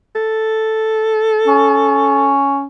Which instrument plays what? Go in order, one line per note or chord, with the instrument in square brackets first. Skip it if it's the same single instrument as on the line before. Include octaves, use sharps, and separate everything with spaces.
[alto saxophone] A4
[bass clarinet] C#4